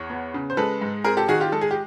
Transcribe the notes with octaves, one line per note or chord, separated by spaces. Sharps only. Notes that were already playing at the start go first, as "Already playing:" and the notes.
Already playing: E2 C#5
B3
C#3
C5
G#3 A4 B4
G#2
C4 G#4 A#4
G4 A4
D#3 F#4 G#4
F4 G4
G#3 A4
G#4
G4